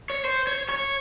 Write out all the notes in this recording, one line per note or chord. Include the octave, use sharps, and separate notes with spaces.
C#5
C5
C#5
C#5